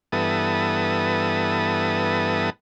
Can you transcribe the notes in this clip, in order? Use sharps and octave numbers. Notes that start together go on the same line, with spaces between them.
G2 E3 B3 A4 D#6